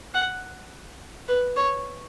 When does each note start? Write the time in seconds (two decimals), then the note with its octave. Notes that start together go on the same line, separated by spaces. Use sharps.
0.14 F#5
1.28 B4
1.56 C#5